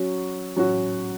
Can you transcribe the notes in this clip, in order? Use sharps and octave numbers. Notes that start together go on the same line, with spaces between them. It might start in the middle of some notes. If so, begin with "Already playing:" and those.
Already playing: F#3 C#4 F#4
F#3 C#4 F#4